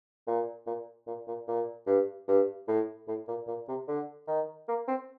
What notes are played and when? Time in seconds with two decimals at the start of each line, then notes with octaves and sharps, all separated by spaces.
0.27 A#2
0.66 A#2
1.07 A#2
1.27 A#2
1.48 A#2
1.87 G2
2.28 G2
2.68 A2
3.08 A2
3.28 A#2
3.47 A#2
3.68 C3
3.88 D3
4.28 D#3
4.68 A#3
4.88 C4